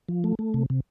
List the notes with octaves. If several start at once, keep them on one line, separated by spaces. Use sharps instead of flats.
F3
A3
A3
C3
C3